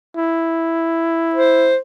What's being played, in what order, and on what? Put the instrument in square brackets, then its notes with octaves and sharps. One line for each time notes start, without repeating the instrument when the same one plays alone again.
[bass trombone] E4
[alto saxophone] C5